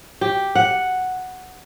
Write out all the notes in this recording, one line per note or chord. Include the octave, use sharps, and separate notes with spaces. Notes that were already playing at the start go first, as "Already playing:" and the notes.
G4
F#5